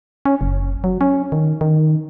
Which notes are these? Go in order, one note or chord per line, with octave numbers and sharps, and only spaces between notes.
C#4
F#1
F#3
C#4
D#3
D#3